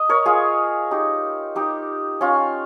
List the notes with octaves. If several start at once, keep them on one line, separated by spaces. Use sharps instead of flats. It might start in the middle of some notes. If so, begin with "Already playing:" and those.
Already playing: D#5
A#4 C#5
F4 G#4
D#4 G4
D#4 G4
C#4 F4